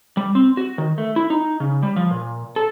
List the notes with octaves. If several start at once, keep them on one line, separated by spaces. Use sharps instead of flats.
G3
C4
F#4
D#3
A3
E4
D#4
C#3
G3
F3
A#2
A4